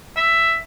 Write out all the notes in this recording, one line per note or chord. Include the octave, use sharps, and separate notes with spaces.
E5